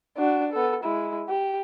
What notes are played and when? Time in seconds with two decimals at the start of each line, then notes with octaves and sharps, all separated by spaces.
0.18 D4 F#4
0.52 B3 A4
0.84 G#3 E4
1.29 G4